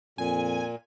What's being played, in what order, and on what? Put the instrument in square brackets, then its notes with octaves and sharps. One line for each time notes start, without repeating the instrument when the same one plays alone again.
[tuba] F2 [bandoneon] A#2 [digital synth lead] G#5